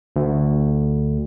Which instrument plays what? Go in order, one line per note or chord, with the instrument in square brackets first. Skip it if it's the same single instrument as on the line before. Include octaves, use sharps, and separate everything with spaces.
[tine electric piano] D2